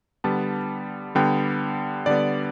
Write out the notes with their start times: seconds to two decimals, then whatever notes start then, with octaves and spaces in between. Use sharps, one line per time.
0.24 D3 G3 B3 A5
1.15 D3 G3 B3 G5
2.06 D3 G3 B3 D5